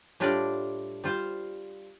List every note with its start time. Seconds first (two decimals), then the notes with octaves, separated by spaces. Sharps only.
0.20 A2 G3 D4 F4 D5
1.04 G3 F4 C5 F5